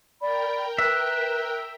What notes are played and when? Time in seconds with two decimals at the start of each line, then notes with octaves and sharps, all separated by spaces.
0.21 A#4 D5 G5 B5
0.78 B4 E5 F#6